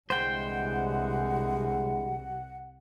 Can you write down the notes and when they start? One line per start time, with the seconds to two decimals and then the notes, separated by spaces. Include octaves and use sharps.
0.10 C2 D3 E3 G#3 C5 F#5 G5